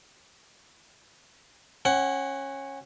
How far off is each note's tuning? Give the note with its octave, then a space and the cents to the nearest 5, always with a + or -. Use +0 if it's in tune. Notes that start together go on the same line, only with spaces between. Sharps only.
C#4 -20 F#5 +15